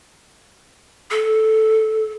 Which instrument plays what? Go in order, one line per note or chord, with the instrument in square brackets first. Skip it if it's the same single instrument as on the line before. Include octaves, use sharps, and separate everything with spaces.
[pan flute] A4